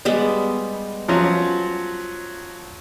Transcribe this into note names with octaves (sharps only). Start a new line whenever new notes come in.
G3 G#3 B3
F3 F#3 C#4